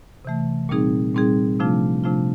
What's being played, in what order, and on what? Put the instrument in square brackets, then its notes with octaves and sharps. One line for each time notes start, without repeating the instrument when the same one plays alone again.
[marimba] C3 E3 A3
A#2 G3 C4 D#4 G#4
A#2 G3 C4 D#4 G#4
C3 F3 A3 D4 F4
C3 F3 A3 D4 F4